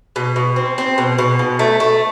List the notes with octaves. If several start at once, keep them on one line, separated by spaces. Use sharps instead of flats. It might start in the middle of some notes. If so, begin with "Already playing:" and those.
B2
B2
C4
C4
B2
B2
B2
A3
A3